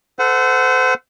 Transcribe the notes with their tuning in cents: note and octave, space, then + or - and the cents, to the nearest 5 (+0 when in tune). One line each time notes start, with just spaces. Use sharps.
A4 +0 C5 -35 F#5 +0